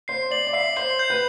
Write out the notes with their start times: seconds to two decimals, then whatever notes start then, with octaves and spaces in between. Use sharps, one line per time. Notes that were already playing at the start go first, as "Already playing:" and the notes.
0.08 C5 C7
0.31 D5 F#7
0.47 D5
0.53 E5 C7
0.76 C5 C7
0.99 G6
1.10 B4